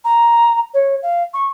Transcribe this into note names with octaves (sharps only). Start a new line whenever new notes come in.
A#5
C#5
F5
C#6